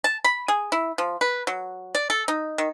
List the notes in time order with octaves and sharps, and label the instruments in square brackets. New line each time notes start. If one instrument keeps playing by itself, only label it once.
[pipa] A5
B5
G#4
E4
F3
B4
F#3
D5
A4
D#4
D#3